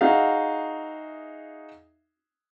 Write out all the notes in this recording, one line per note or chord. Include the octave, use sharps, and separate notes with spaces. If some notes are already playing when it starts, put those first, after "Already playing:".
D#4 F#4 G#4 E5 F5